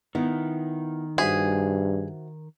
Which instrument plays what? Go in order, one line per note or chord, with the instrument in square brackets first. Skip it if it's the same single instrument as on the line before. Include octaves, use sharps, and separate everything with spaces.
[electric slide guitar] D#3 [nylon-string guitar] B3 E4
[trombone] G2 [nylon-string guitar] F#4 C5 E5 [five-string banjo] G#4